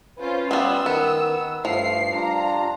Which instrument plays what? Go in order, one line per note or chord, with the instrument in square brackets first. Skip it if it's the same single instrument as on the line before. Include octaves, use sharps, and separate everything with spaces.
[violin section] C#4 F4 C5 [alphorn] B4
[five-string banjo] G3 B3 [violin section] E6
[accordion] D#3 [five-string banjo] B3
[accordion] G2 [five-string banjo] F3 [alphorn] A3 [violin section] C7
[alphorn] G3 [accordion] D4 F4 [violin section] A#5